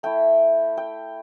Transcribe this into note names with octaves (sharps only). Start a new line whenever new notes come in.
A3 E4 G5
G5